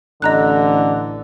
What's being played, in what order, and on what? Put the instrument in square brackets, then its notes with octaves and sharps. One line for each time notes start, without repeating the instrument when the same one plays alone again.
[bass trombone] A1 [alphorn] D3 [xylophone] D#5 A#5 F#6